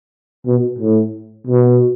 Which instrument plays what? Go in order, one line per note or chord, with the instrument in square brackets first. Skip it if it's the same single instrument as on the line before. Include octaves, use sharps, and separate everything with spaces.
[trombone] B2
A2
B2